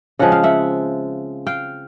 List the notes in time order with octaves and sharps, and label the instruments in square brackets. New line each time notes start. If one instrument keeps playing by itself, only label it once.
[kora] C#3 F3 G#3 C4 F#5
F5
E5 F#5
F5 G5